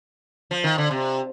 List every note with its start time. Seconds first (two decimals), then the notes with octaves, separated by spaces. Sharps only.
0.51 F3
0.64 D#3
0.78 D3
0.91 C3